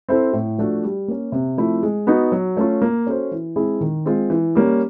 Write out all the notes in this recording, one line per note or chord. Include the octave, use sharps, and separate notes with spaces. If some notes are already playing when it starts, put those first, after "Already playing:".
C4 E4 A4 C5
A2
F3 A3 D4 F#4
G3
A#3 C#4
C3
F3 A3 C4 E4
G#3
B3 D#4 F#4
F#3
A3 C#4 F4
A#3
C#4 F#4 A4 C5
E3
G#3 C4 E4 G#4
D#3
G#3 C4 F4
E3
G3 A#3 C#4